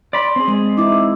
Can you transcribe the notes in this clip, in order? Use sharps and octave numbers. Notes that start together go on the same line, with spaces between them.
D5 B5 C6
C4 G#4
G#3
D#4 E4 D6